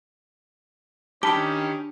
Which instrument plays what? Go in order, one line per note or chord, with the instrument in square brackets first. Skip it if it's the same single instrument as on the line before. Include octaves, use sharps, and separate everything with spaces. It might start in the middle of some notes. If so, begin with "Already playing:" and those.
[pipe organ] D#3 C#4 [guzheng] D4 [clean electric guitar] G4 B5 [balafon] A5